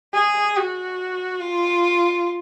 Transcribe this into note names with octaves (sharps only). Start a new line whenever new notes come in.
G#4
F#4
F4